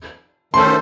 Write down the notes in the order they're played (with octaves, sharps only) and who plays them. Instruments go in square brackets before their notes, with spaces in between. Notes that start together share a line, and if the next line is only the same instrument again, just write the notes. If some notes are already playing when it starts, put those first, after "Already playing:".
[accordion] D#3 A3 C#4 A4 C5 [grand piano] C6